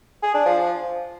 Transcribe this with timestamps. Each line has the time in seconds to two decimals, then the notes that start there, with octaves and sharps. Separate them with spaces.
0.23 G#4
0.34 D4
0.46 F3